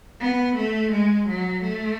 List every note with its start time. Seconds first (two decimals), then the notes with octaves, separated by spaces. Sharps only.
0.21 B3
0.56 A3
0.92 G#3
1.28 F#3
1.63 A3